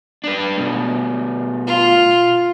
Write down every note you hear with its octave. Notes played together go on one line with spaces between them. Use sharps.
D4 B4
B2 A3
F4